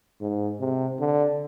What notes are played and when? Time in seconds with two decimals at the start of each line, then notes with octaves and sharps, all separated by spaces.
0.21 G#2
0.60 C3
1.00 D3